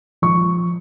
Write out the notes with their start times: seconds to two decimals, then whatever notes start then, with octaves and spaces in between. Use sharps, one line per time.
0.22 F3 C#6